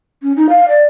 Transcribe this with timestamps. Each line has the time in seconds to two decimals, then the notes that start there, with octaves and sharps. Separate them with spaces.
0.22 C#4
0.37 D#4
0.49 F5
0.68 D5